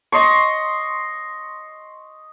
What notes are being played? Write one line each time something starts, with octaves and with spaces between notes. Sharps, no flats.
D#5 C6 C#6